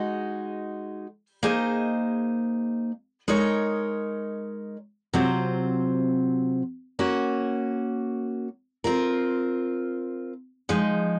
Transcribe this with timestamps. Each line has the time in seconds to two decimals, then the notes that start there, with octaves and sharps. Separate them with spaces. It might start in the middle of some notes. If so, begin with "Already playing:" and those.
Already playing: G#3 D#4 F#4
1.43 A#3 D#4 G#4 C5 D#5
3.28 G#3 D#4 A#4 C#5
5.13 C3 F#3 C4 F4 C5
6.99 A#3 C#4 F#4 C#5
8.84 C4 F4 A#4
10.69 F3 G#3 D#4